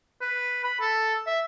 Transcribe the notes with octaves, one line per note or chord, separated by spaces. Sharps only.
B4
B5
A4
E5